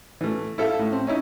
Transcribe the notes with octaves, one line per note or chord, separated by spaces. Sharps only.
E3 A3
E4 A4 E5 F5
A2
C4
C#4 D#4 E4